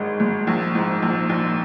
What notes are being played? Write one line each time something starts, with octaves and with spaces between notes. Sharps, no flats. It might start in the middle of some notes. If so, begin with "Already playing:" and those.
Already playing: G#1 G2 G#3
G#1
A#1
G#2
A#1
A#1